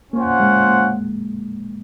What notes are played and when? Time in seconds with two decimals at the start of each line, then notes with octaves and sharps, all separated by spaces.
0.13 A#3 C#4 F4 C5 F#5
0.40 G#3
0.67 A#3